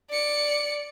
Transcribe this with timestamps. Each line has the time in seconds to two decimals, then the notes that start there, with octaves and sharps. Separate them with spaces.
0.11 D5 C#7